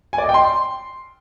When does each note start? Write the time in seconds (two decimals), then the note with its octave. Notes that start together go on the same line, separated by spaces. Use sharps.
0.13 G#5
0.18 D5
0.24 D#5
0.29 G5
0.34 C6